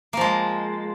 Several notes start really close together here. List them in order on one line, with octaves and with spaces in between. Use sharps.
A#3 F3 G#3